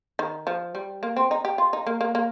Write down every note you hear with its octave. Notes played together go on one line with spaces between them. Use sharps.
D#3
F3
G3
A#3
C4
D#4
G4
F4
D#4
A#3
A#3
A#3